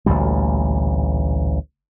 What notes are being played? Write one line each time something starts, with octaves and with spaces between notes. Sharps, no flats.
A1 D2 A#2 G3